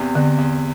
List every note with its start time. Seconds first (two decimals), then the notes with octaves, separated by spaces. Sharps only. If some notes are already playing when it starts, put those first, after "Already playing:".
Already playing: E2 C3
0.15 E2 D3
0.38 E2